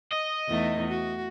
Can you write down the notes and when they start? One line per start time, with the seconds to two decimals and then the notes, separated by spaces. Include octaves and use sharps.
0.13 D#5
0.49 E2 A3 D#4
0.88 F#4